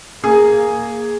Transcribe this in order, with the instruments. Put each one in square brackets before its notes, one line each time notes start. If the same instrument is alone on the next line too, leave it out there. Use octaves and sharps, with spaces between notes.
[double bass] A#3 [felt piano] G#4